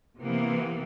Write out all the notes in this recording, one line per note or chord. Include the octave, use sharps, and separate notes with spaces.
C3 E3 A#3 B3